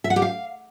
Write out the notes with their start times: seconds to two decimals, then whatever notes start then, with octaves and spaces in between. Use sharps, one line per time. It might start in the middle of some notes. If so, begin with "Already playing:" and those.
0.04 E5
0.10 F#5
0.16 G4
0.22 F5